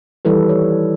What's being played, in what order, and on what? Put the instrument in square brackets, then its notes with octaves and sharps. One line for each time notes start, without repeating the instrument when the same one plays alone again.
[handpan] D#3 E3 G3 E4 A4 B4
C#5